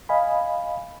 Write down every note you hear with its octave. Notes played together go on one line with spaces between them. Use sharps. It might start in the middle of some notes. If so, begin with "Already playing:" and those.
D#5 F5 G#5 B5